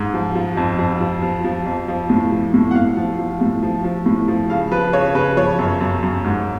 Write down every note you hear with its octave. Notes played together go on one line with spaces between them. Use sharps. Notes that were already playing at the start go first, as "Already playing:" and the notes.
Already playing: G#2
F3
F3
F2
F2
F3
F3
F3
F2
F3
A2
F3
A2
F#5
A2 F5
F3
F3
A2
F3
F3
A2
F3
C#3 F5
F3 B4
C#3 C#5
C#3 B4
F3 C#5
F#2
F#2
F#2
G#2